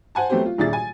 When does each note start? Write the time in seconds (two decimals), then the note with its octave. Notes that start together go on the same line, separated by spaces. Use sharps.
0.15 C5 F#5 G#5 A5
0.30 F#3 A3 B3 C4 G4 C5
0.46 F4
0.58 D#1 A#2 D4 G#4 E5 A6
0.73 G#5